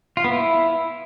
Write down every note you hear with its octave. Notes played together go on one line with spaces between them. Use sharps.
F4
B3
E4